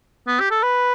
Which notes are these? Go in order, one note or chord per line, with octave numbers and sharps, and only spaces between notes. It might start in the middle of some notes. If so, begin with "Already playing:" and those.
B3
G4
A4
B4